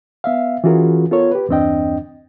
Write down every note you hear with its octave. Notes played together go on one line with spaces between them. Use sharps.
B3 E5 F5
E3 C#4 F4 F#4 G#4 A#4
B3 F4 A4 A#4 C#5
G4 B4
E2 G2 C4 D4 D#5 G5